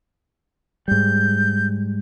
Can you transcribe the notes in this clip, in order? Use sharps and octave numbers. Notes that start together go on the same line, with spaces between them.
G#2 G3 G6